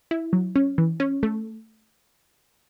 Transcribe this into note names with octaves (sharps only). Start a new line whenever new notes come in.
E4
F#3
C#4
E3
C#4
A3